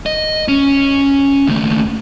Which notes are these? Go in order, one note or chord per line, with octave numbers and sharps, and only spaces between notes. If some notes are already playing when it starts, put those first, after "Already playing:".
D#5
C#4
D#2 A3